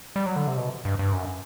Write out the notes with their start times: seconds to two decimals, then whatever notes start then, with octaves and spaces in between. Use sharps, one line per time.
0.16 G3
0.26 F#3
0.36 D3
0.47 C3
0.57 B2
0.85 G2
0.99 G2
1.13 F#2